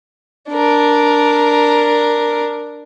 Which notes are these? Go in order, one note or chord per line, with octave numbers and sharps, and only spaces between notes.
D4 A#4